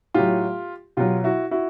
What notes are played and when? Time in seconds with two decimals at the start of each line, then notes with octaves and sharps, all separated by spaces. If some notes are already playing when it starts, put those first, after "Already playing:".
0.14 A2 F#3 F4 G4
0.97 B2 F#3 F4 G4
1.24 E4 F#4
1.51 E4 F#4